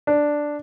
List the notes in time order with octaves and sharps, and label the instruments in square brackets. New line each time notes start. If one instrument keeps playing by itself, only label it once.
[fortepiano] D4